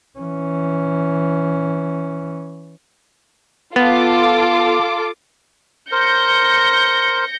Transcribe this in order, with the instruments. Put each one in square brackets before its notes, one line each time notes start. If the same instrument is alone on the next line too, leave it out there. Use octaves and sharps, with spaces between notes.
[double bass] E3 C#4
[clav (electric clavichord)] B3 [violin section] F4 A4 D6
[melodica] A#4 C5 [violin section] G6 A#6 C#7